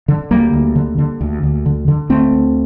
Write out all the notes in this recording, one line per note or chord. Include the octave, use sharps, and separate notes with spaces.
D3
D2 G3 A#3
D2
D3
D3
D2
D2
D3
D3
D2 A3 C4
D2